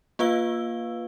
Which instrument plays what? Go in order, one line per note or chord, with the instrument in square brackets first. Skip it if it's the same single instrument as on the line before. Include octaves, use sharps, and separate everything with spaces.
[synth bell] A#3 F4 B4 F5 E6 G7